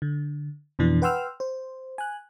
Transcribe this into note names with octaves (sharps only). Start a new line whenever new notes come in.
D3
F2 B2 E3 D4
B4 F#5 G5 C6 E6 F6
C5
G#5 F#6